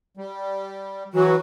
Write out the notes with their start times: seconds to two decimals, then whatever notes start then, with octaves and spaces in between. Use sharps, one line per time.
0.17 G3
1.14 E3 F#3 F#4